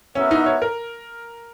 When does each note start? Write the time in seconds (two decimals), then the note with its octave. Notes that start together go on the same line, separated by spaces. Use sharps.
0.15 B3 C#4 F#4 A#4 E5
0.31 D#4
0.46 C#5
0.62 A#4